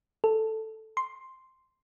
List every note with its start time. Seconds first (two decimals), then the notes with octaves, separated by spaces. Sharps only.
0.24 A4
0.97 C6